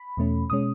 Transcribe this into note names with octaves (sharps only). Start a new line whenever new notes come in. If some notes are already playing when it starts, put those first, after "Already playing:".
Already playing: B5
E2 B2 A3 C#4
B2 G#3 C#4 D#6